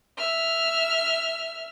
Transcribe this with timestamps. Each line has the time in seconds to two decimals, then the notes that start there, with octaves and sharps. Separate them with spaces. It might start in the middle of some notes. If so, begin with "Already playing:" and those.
0.18 E5 F6